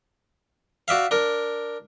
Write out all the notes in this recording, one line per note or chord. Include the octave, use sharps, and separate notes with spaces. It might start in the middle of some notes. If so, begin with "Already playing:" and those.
F#4 D5 E5 F5
D4 A#4